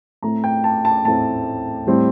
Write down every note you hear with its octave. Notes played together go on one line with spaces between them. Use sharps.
A2 A3 C4 A#5
G5
A5
A5
A2 A3 C4 A5
A2 G3 C4